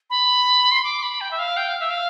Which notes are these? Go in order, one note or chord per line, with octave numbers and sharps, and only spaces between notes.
B5
C6
D6
B5
G5
E5
F5
G5
F5
E5
F5